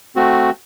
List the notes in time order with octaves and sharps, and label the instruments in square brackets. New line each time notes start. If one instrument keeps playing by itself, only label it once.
[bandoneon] A3 C4 F#4